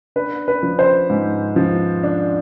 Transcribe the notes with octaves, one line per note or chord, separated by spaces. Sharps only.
D4 B4
B4
F3
C5
G#2
F3
D4